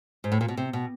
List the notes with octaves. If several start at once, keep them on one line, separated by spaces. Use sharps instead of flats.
G#2
A2
A#2
B2
C3
B2